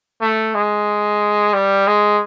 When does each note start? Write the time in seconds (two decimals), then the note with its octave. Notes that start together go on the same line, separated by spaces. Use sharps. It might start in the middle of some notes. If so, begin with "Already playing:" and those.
0.21 A3
0.55 G#3
1.53 G3
1.87 G#3